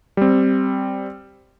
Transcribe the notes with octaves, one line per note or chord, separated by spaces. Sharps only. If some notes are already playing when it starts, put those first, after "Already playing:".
G3 C4